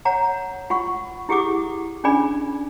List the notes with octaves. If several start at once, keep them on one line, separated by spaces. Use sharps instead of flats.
C#5 F#5 A#5
F4 F#5 C#6
E4 G4 G#4 F#5 D6 D#6
C#4 D4 G#4 D5 G#5 B5